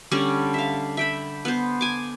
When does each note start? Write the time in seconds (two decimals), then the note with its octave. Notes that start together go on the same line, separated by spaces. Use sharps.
0.11 D3 G3 C#4 D5
0.54 E5 F5
0.97 E5 G5 B5
1.45 B3 C5
1.81 G#5 D6